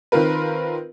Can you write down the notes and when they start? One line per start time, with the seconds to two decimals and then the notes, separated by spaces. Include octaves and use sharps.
0.12 D#3 C4 F4 A#4 B4